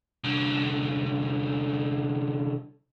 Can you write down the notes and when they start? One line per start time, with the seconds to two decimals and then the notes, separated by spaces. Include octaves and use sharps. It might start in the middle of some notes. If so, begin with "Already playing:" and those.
0.24 C2 D3